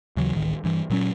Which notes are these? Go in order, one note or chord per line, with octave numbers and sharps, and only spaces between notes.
D#2 C#3 E3 F#3
D1 A1 D#3
G2 E3
A#2 F#3 C#4